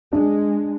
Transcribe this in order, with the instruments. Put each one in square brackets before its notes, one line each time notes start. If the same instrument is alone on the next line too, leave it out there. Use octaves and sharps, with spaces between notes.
[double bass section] G#3 [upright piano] D4